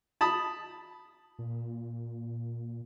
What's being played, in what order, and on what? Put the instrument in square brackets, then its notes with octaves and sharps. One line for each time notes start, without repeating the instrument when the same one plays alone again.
[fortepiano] A5 B5 D#6
[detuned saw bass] A#2